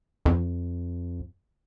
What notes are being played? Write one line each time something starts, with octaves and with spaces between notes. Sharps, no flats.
F2